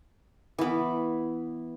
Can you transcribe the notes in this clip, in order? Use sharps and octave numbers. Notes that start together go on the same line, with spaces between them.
E3 B3